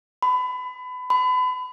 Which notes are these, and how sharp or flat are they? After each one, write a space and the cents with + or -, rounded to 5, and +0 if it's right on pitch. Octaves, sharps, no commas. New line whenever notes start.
B5 +30
B5 +35